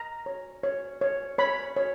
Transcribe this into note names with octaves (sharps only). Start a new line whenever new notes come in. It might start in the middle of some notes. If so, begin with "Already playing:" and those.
Already playing: A#5
C#5
C#5
C#5
C#5 B5
C#5